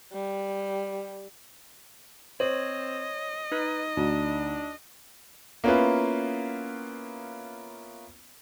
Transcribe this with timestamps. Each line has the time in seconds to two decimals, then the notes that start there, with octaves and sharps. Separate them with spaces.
0.13 G3
2.40 C4 C5 C#5 D#5
3.52 D#4 B4
3.97 D2 D4
5.64 A#3 B3 C#4 E4 F4 B4